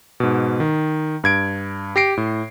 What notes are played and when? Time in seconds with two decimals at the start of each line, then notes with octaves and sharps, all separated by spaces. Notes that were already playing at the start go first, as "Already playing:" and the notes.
0.20 G#2 B2
0.60 D#3
1.24 G2 G#6 D7
1.96 G4 A#6 C7 D7
2.17 A2